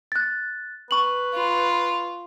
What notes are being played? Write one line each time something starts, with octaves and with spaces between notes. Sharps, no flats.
F#6 A6
B4 C#6 F#7
F4